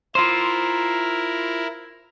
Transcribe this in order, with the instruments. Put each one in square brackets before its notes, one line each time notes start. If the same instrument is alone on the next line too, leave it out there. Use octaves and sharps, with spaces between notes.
[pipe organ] E4 A#4 [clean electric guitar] F4 C5